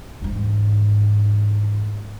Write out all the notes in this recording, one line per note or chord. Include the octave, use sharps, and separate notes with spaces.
E2 G#2